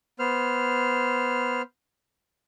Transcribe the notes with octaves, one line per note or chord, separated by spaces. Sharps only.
B3 C5 F6